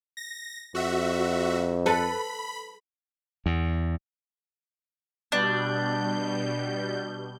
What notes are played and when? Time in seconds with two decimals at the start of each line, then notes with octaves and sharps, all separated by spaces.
0.17 A#6
0.75 F2 F#4 E5
1.86 A4 B4 B5
3.46 E2
5.32 B2 G3 D4 G6